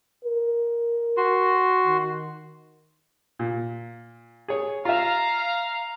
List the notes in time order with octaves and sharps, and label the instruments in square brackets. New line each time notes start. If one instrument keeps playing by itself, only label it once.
[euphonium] A#4
[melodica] F#4 C6
[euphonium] D#3
[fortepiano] A#2
G#4 C#5
[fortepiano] F4 E5 [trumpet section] F5 A#5